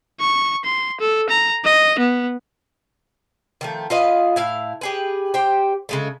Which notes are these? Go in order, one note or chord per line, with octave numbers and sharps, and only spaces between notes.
C#6
C6
A4
A#5
D#5
B3
D#3 F3 A3
F4 B4 D#5 F5
A2 E4 F5
G4 G#4 B4
G4 C5 G5
C#3 G#3 A3